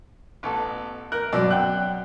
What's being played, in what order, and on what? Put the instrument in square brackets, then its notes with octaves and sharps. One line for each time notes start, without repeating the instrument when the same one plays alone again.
[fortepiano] A1 B3 A4
[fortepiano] A#4 [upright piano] F#6
[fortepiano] F#2 D5 E6 [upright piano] B2 F#3
[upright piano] F#5 G5 F#6